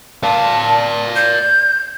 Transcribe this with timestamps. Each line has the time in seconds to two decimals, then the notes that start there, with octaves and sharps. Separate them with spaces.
0.23 D5 F5 A5
1.15 G6